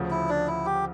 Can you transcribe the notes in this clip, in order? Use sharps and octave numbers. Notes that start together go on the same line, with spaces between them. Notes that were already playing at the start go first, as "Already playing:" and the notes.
Already playing: D2 C#3 F3
E4
D4
E4
G4